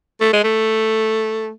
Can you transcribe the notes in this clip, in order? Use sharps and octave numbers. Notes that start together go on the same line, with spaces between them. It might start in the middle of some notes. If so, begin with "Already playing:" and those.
A3
G#3
A3